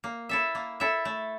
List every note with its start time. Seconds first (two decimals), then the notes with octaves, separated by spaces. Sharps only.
0.04 A#3
0.29 E4 A4 E5
0.55 A#3
0.80 E4 A4 E5
1.05 A3